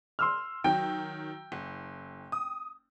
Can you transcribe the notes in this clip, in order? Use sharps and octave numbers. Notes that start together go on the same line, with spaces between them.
C6 E6 F6
D#3 F#3 G5
F#1
D#6